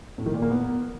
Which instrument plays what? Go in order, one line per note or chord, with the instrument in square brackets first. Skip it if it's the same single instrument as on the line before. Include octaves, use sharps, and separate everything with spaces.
[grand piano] A2
D#3
A#2
A#3
B3